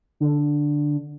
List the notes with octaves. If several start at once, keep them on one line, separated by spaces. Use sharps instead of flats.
D3